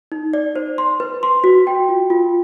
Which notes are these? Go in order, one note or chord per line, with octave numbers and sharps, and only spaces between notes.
D#4
D5
C5
C6
B4
C6
F#4
G5
F4
F4